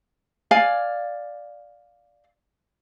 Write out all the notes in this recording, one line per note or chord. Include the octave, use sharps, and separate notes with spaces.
D5 F5 G#5